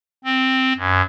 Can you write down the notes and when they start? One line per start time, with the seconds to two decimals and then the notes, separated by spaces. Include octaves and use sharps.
0.24 C4
0.78 F#2